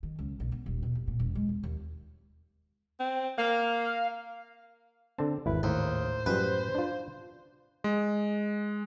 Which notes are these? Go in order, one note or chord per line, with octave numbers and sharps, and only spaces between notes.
D#3
C#2
B1
B3
D#1
B2
F1
A#2
E1
G#3
E2
D#2
C4
A#3 F5
D3 C4 A5
G#1 E2 E4 B4
D#2 A2 C5
F#2 F3 G3 B4
D4 F4
G#3